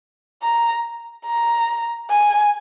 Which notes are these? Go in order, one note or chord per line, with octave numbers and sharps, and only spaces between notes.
A#5
A#5
G#5